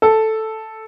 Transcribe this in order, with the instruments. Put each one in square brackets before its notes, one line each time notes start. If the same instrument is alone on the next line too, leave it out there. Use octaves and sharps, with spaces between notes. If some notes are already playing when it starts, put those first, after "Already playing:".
[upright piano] A4